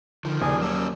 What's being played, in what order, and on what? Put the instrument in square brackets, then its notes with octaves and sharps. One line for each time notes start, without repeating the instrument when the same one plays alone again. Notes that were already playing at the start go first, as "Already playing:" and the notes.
[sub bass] D3 [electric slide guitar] D#3 F3
[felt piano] D#1 D5 [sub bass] C#3 [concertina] G#4 G#5
[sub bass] F#3 [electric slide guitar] A#3 C#4 [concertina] E6